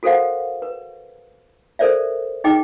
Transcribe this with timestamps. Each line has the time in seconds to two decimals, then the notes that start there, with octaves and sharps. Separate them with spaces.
0.03 F#4 A4 A#4 C5 F5 F#5
0.62 B4
1.79 A4 A#4 C5 D5 E5
2.44 D#4 G#4 D#5 G5 D6